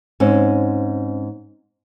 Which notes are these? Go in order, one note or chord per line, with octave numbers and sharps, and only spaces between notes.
G#2 C4 C#4